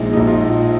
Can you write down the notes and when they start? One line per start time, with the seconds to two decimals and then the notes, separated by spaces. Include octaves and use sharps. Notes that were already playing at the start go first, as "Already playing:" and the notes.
Already playing: A#1 A#2 G#3 D#4
0.12 A#1 A#2 G#3 D#4
0.27 F4